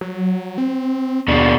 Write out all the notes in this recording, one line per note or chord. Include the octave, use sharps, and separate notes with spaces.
F#3
C4
D#2 B2 D4